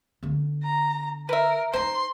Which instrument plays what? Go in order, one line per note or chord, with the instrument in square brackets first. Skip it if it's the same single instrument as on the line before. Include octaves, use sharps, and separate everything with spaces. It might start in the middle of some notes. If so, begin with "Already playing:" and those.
[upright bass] D3 B3
[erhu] A#5
[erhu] A#4 [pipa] B4 E5
[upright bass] D#4 [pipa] C5 A#5 [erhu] C6